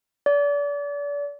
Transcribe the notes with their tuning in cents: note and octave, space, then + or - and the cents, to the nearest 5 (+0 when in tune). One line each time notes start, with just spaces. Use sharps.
D5 -35